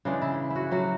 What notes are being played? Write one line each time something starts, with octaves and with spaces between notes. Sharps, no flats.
C#3 E3 G#3 D4
E4
E4
F#4
A2 F#3 A3 F#4